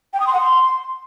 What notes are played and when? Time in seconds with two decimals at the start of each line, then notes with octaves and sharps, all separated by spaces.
0.13 G5
0.20 D#6
0.27 C6
0.33 F#5
0.40 C6